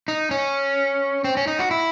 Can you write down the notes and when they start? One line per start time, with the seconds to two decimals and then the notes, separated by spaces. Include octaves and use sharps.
0.08 D#4
0.31 C#4
1.24 C4
1.37 C#4
1.47 D#4
1.59 F#4
1.71 E4